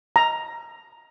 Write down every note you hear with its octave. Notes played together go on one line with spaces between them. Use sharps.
A#5